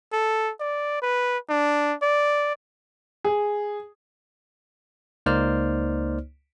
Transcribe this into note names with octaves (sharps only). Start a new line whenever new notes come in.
A4
D5
B4
D4
D5
G#4
C#2 A#3 D#4 C5 D5 F6